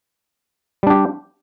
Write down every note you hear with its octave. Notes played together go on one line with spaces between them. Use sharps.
G3 D4 G4